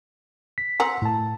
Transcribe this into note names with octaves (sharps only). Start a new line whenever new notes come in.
B6
C4 F#5 A#5
A2 A5